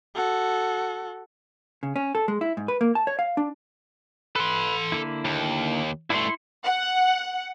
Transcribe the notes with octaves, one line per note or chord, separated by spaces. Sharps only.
F#4 A4
C#3
C#4
A4
G#3
E4
G#2
B4
A#3
A5
C#5
F5
D4
A4 B4 C6
D3 A#3 E4
D#2
G2 A3 E4 C6
F#5